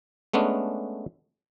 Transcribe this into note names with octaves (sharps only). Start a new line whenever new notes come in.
G#3 A3 B3 C#4 D4